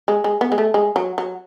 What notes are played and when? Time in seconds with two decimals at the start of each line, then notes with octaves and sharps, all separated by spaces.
0.08 G#3
0.24 G#3
0.41 B3
0.52 G#3
0.58 A3
0.74 G#3
0.96 F#3
1.18 F#3